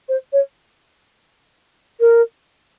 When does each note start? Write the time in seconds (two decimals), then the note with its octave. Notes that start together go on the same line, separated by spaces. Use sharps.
0.08 C5
0.32 C#5
2.00 A#4